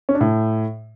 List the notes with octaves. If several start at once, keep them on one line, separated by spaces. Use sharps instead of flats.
C#4
D4
A2